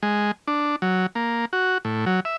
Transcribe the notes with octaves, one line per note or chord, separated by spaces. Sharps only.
G#3
D4
F#3
A#3
F#4
A2
F#3
E5